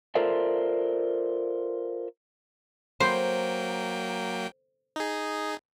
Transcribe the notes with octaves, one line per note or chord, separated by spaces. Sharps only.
F4 A4 A#4 C5 D5 E5
F#3 A#3 C5 G5
D#4 G#4